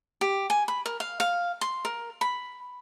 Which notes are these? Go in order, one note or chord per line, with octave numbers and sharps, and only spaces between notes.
G4
G#5
B5
A#4
F5
F5
C6
A#4
B5